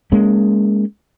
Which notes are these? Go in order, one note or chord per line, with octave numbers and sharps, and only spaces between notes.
G#3 A#3 C#4